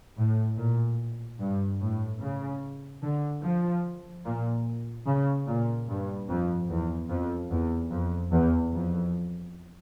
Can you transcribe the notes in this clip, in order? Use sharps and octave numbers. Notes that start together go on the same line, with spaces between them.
A2
A#2
G2
A2
C#3
D3
F3
A#2
C#3
A#2
G2
F2
E2
F2
E2
F2
E2
F2